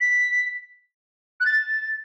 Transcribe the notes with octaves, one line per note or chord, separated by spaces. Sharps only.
B6
F#6
A6